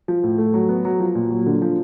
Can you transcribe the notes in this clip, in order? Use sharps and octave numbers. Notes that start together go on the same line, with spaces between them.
F3
A2
A3
F#3
B3
F#3
F3
A#2
F#3
D3
F3